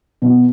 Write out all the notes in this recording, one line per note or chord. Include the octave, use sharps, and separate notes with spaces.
B2